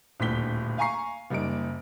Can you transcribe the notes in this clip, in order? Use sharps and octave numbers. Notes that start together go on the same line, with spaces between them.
D#1 D2 A2 B6 G7
F5 G#5 A#5 C#6 C7
F#1 G3 A#3 D#4 D7